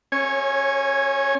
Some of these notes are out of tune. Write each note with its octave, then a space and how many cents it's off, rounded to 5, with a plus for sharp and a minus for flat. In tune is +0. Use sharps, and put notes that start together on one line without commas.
C#4 -30 C#5 +0 G#5 +0